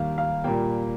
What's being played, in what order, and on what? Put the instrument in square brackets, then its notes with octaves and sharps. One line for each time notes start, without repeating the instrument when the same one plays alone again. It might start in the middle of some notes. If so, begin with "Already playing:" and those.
Already playing: [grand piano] D#2 D#3 G3 A#3 F5
F5
A#2 G3 A#3 G5